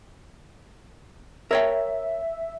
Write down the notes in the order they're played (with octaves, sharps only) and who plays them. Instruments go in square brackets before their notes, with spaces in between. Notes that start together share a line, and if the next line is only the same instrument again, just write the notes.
[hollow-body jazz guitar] A#4 C#5 G5 [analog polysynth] E5